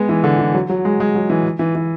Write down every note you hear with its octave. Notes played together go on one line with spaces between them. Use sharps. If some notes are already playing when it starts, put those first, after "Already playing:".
Already playing: G#3 B3
E3
D3
E3
F#3
F#3
G#3
G#3
F#3
E3
E3
E3